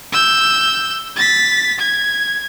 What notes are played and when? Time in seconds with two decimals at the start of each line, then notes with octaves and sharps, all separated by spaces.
0.13 E6 G6
1.16 A6 B6
1.79 G#6